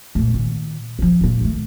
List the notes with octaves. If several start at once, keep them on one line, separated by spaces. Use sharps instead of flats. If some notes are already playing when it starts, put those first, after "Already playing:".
A#2 A3
A#2 D#3
E3 F3
A#2 A#3
D#3 A3